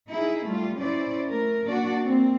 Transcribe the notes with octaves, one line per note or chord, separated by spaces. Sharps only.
D#4 E4 G#4
G3 A3 F4
C#4 E4 C5 D5
A3 A#4
A#3 D4 F#4 D5
A#3 C4